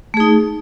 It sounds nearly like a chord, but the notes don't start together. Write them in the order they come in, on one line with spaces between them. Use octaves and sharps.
A3 G#4 D#4